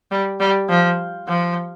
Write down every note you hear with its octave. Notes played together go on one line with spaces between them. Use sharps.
G3
G3
F3
F3